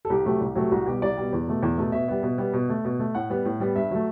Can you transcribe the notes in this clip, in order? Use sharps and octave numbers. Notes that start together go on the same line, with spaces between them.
A4
C2 G4
C3 F#3 A3
C2
C3 F#3 A3
C2 F#4
B2 G3 G4
C2 D5
B2 G3
E2
B2 A3
E2
B2 A3
B2 E5
G3 B3
B2
G3 B3
B2
A3
B2
A3
A2 F#5
G3 B3
A2
G3 B3
G2 E5
F#3 A3